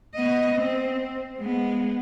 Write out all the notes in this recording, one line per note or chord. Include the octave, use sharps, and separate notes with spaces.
B3 D#5
C4
G#3 B3